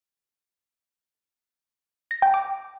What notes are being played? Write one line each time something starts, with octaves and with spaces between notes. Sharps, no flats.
A#6
G5
D6